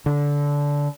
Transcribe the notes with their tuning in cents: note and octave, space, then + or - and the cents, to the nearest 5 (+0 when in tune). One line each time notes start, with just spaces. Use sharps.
D3 -20